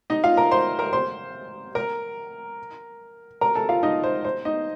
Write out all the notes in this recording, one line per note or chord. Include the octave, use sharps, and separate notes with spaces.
D#4 D#5
F4 F5
A#4 A#5
C5 C6
A#4 A#5
C5 C6
A#4 A#5
A#4 A#5
A4 A5
F4 F5
D#4 D#5
C5
C5
D#4 D#5